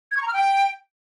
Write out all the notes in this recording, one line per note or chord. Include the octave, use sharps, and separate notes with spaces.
G#6
C#6
A#5
F6
G5